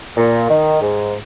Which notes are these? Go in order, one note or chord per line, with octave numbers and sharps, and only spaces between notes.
A#2
D#3
G#2